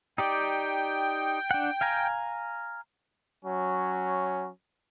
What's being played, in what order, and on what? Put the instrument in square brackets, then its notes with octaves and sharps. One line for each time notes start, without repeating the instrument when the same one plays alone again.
[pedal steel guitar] D#4 G4 D5 [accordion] G5
[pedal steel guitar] D4 F#5
F5 G#5 A#5
[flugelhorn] F#3 [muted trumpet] C#4